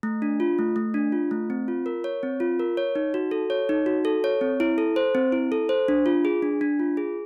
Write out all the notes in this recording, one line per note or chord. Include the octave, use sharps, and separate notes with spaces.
A3
D4
F4
A3
A3
D4
F4
A3
C4
F4
A#4
C#5
C4
F4
A#4
C#5
D#4
F#4
A4
C#5
D#4
F#4
A4
C#5
C4
E4
A4
C5
C4
E4
A4
C5
D4
F4
G#4
D4
D4
F4
G#4